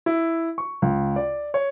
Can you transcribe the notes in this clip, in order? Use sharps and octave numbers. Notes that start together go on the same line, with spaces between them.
E4
C#6
C#2
D5
C#5